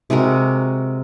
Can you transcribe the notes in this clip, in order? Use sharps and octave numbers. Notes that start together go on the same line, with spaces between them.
C3 G#3 F#4 A#4